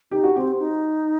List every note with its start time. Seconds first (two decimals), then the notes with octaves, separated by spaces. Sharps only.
0.11 D#4 G4
0.24 F#4
0.35 C4 G4
0.59 D#4